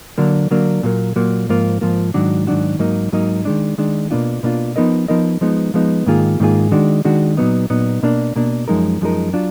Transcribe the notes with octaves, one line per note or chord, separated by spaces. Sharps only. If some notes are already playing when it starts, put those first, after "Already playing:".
D3 F#3 A#3 D4
D3 F#3 A#3 D4
A#2 F#3 A#3
A#2 F#3 A#3
G#2 F3 A#3 F4
G#2 F3 A#3 F4
G#2 D#3 F#3 D4 F#4
G#2 D#3 F#3 D4 F#4
G#2 F#3 A#3 D#4
G#2 F#3 A#3 D#4
D#3 G#3 D4
D#3 G#3 D4
B2 A#3 D4 F4
B2 A#3 D4 F4
F3 B3 D#4 A#4 D#5
F3 B3 D#4 A#4 D#5
F3 G#3 B3 D#4
F3 G#3 B3 D#4
G#2 D#3 A#3 F4 G#4
G#2 D#3 A#3 F4 G#4
D#3 G#3 D4 F#4
D#3 G#3 D4 F#4
A#2 F#3 B3 D#4
A#2 F#3 B3 D#4
B2 A#3 D4
B2 A#3 D4
F#2 F3 G#3 D#4 A#4
F#2 F3 G#3 D#4 A#4
F#3 D4 F4